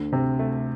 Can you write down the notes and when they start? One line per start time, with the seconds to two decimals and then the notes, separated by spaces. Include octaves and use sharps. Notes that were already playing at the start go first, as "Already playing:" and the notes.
Already playing: D2 D3
0.12 C3 C4
0.39 A3